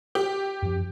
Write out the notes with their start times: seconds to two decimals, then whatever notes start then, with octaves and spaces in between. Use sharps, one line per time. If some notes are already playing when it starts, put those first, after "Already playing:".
0.15 G4
0.63 F#2 F3